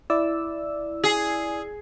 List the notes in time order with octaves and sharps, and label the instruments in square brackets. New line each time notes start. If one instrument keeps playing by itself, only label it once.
[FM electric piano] E4 D5 E6
[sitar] G#4